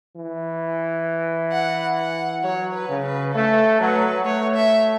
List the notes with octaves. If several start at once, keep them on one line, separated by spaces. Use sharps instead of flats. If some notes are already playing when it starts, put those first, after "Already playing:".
E3
F#5
F#5
F#3 C#5
B4
C#3
B4
A3 A4
F#3 B4
A3 C#5
E5